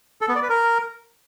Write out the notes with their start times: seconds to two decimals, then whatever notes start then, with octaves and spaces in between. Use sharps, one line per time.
0.21 A4
0.28 B3
0.35 D5
0.42 B4
0.49 A#4